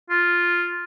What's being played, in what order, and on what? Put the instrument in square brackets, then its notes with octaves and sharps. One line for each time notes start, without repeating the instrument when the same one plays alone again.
[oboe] F4